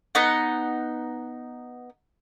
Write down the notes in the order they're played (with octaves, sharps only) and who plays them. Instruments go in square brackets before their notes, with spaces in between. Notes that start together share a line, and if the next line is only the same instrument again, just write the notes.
[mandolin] B3 D#4 F#5